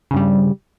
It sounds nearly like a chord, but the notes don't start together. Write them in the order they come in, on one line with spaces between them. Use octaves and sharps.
C#3 G2 G3